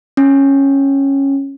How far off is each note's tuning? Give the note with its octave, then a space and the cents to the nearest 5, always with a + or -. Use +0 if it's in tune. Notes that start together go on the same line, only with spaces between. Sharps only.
C#4 -10